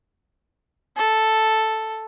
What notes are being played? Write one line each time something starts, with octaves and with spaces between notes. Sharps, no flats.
A4